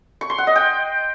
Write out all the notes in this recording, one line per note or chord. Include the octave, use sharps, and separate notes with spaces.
C#6
C6
F#5
D#5
G5